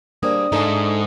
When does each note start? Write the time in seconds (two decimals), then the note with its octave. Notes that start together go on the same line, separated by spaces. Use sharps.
0.23 G3 A#3 D4 G#4 C5 D5 D#6
0.52 G#2 G#3 D#4 A4 E5